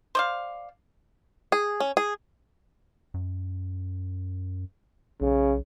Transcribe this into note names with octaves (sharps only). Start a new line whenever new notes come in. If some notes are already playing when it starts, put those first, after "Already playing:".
C5 D5 F5
G#4
C#4
G#4
F#2
B1 C#3